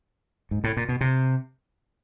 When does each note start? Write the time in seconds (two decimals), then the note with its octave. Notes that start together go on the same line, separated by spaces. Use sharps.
0.51 G#2
0.64 A2
0.77 A#2
0.89 B2
1.01 C3